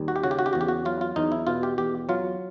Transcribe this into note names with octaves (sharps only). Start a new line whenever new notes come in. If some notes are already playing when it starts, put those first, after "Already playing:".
Already playing: D#2 G3
F#4
G4
C#3 F#4
G4
F#4
G4
E2 F#4
G4
F#4
F#3 F4
F4
E2 D#4
E4
B2 F4
G4
E2 G4
F#3 F4